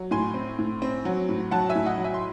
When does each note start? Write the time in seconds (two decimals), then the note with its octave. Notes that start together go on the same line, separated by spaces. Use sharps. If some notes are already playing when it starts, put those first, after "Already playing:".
Already playing: F#3
0.11 A2 G#5 C6
0.34 C4
0.59 A2
0.82 C4
1.05 F#3
1.29 A2
1.51 F#3 F#5 A5
1.69 E5 G#5
1.75 A2
1.86 D#5 F#5
1.98 F#3
2.04 E5 G#5
2.14 C6